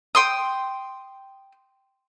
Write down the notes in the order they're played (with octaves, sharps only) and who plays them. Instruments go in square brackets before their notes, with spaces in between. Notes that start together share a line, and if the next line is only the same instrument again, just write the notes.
[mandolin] G5 C6 D#6